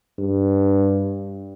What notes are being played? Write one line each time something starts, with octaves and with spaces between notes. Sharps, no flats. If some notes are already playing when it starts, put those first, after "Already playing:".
G2